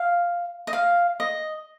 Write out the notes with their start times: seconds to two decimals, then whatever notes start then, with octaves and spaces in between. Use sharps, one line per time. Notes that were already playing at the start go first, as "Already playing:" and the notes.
Already playing: F5
0.67 D#5
0.73 F5
1.20 D#5